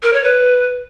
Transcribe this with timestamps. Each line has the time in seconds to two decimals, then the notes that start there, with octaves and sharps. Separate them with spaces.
0.03 A#4
0.13 C#5
0.23 B4